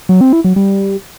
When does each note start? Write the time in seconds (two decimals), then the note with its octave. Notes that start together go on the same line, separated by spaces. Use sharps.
0.09 F#3
0.21 C4
0.33 E4
0.44 F#3
0.56 G3